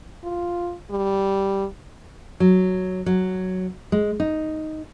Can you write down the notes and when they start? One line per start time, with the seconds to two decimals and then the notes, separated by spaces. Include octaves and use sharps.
0.24 F4
0.91 G3
2.40 F#3
3.06 F#3
3.92 G#3
4.20 D#4